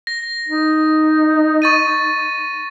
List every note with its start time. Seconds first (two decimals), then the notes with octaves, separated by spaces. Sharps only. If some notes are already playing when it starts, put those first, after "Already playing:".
0.07 A#6
0.48 D#4
1.62 C#6 A6 D#7